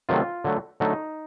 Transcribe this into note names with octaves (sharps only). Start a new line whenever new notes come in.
C3 D#3 F#3 A3 F4
D3 F#3 A3
D3 F#3 A3 D#4